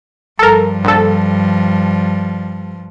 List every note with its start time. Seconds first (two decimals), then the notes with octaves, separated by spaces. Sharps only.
0.39 G2 F3 A4 A#4
0.84 A#1 A4